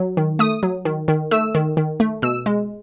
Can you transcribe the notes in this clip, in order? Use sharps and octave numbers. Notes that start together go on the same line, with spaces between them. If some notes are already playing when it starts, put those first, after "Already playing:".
Already playing: F#3
D#3
A3 D#6
F#3
D#3
D#3
A3 E6
D#3
D#3
A3
B2 E6
G#3